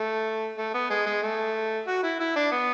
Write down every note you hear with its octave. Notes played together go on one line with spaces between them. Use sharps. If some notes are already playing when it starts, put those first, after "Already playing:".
Already playing: A3
A3
B3
G#3
G#3
A3
F#4
E4
E4
D4
B3